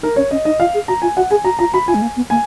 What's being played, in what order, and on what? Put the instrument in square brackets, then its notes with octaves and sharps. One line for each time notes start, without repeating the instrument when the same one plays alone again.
[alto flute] D#4 [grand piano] A#4
[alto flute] C#4 [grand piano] C#5
[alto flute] C#4 [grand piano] D#5
[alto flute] D#4 [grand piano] D#5
[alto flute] F4 [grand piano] F5
[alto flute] G#4
[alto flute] F#4 [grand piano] A#5
[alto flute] F4 [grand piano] G#5
[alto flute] F#4 [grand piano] F#5
[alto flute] G#4 [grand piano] G#5
[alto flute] F#4 [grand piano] A#5
[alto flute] F4 [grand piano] A#5
[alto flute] F#4 [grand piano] B5
[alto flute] F4 [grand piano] G#5
[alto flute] G#3
A#3
B3
[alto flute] A#3 [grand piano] G#5